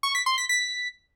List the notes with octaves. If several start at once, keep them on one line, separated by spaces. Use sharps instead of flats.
C#6
B6
C6
B6
B6